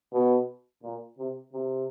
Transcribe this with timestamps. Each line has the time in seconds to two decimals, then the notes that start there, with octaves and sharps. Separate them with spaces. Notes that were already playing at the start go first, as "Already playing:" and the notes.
0.12 B2
0.82 A#2
1.18 C3
1.53 C3